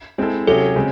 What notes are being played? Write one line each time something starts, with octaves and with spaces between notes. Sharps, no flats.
G#3 C4 E4 A4
C3 F#3 C#4 G#4 A4
C#3 G#3 C4